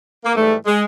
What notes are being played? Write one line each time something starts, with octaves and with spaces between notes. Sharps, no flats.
A#3
G#2 E3 G3 A3
G#3